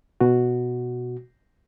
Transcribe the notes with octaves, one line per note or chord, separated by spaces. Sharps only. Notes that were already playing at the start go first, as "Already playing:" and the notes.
B2 F#4